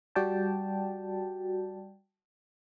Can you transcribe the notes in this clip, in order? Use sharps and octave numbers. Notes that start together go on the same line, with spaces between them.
G3 F#4 D5 G5 A5